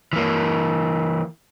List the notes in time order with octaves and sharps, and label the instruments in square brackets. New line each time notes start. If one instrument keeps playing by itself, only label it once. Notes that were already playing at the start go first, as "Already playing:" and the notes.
[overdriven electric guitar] E3 A#3